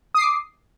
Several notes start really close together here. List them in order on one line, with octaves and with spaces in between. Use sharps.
D#6 C7 D6